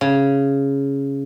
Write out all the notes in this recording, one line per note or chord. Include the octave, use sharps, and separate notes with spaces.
C#3